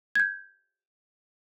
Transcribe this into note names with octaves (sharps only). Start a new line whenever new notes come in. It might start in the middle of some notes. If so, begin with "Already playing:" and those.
G6 G#6